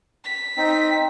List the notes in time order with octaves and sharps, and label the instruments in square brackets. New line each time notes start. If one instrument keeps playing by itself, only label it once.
[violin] B6
[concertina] C4 D#4